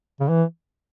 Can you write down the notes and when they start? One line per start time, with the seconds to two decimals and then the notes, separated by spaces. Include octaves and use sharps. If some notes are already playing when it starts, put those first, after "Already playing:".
0.20 C#3
0.29 E3